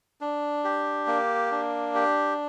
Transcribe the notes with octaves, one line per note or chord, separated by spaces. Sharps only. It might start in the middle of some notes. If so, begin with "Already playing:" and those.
D4
G4
A#3
D4
G4